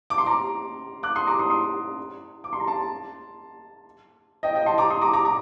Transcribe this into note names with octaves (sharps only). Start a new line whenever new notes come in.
D6
C6
A#5 D6
D6 F#6
C6 D#6
A#5 D6
C6 D#6
C6 D#6
D6
C6
A#5
A5 C6
D#5 G5
D#5 G5
A5 C6
A#5 D6
C6 D#6
A#5 D6
A#5 D6
A#5 D6